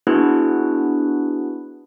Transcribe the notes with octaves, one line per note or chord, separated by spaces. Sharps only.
B3 D4 E4 F#4 G#4 B4